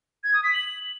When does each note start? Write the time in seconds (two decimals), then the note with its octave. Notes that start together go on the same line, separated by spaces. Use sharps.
0.24 G#6
0.34 D#6
0.44 B6
0.54 F#7